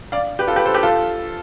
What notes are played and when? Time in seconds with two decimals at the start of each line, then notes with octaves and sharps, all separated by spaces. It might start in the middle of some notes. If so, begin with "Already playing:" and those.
0.12 D5 F5
0.39 G4 B4
0.48 F4 A4
0.56 G4 B4
0.65 A4 C5
0.74 G4 B4
0.83 F4 A4